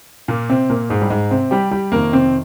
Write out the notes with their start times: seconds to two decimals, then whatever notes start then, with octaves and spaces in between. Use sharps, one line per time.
0.28 A#2 A#3
0.49 C3 C4
0.70 A#2 A#3
0.90 G#2 G#3
1.02 G3
1.10 G#2 G#3
1.31 C3 C4
1.51 G3 G4
1.71 G3 G4
1.92 F2 C3 D#3 A#3 A#4
2.13 C3 C4